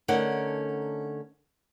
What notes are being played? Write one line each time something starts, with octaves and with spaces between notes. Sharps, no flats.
D3 A3 C#4 D#4 A#4 F#5